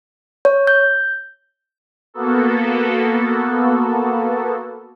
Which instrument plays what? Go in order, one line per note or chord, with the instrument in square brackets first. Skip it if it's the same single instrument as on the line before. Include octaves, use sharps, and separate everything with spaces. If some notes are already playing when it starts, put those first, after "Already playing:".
[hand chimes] C#5
G6
[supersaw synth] A#3 B3 F#4 A4